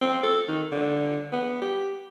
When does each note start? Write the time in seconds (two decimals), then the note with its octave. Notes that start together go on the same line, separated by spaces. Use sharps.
0.01 C4
0.23 A4
0.48 D#3
0.72 D3
1.32 B3
1.62 G4